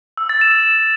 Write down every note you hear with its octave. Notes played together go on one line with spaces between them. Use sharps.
E6
A6
E7